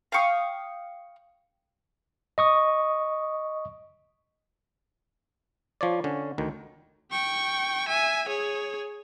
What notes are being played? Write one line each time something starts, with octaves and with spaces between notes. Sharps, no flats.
F5 G5 C#6 D#6
D#5 C#6 D#6
F3 C#5 D5
D3 C#4
D2 D#3
G5 C#6
E5 G#5
G#4 C#5